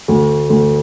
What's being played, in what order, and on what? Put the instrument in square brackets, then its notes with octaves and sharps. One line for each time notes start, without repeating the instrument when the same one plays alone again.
[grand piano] D2
D2